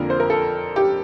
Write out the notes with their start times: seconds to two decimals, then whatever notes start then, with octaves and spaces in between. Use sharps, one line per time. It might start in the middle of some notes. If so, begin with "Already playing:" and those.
Already playing: F2 D3 F3 A#3 A#4
0.10 C5
0.20 A#4
0.30 A4
0.76 G4